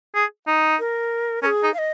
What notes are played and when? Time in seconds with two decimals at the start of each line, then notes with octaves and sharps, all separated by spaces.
0.15 G#4
0.47 D#4
0.79 A#4
1.42 C#4 A#4
1.46 G#4
1.63 D#4
1.74 F5
1.78 D#5